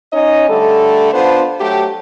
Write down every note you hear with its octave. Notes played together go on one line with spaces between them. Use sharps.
C#4 D#4 C#5 D#5
D3 G3 A3 A4
B3 D4 F4 C5
F#3 A3 G4